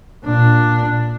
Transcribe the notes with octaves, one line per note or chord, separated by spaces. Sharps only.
A#2 D4